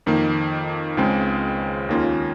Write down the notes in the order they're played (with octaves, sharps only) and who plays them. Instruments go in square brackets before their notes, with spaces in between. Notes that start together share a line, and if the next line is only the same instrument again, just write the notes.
[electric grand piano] F2 D#3 A#3
C#2 C#3 G#3 C4
D#2 D#3 A#3 C#4 F4